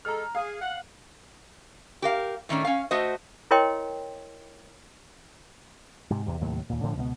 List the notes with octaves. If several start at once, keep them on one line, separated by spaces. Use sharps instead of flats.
G#3 A4 A#5 F6
G#4 F5
F#5
G4 A#4 F5
A2 D#3 A3 C#4 D4
C#4 F5
A3 F#4 C5 D#5
E4 A#4 C#5 D#5 G5 C6
G#2 C3
E2 C3
D#2 A2 C3 F#3
D#2 A#2
A2 D3 F3 D4
C#2 B2 A3 B3